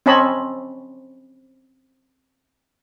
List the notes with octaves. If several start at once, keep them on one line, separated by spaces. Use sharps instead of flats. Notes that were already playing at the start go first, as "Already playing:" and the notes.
C4 C#4 C#5 D#5 A5 B5